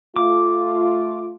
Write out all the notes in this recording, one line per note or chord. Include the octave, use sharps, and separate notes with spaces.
A3 F4 D6